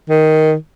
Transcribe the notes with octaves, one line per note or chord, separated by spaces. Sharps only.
D#3